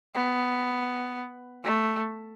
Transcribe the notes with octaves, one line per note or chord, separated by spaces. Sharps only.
B3
A3